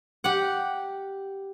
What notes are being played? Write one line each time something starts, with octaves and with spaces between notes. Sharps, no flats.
G4 F#5